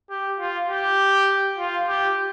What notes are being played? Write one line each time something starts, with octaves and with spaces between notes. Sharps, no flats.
G4
F4
G4
F4
G4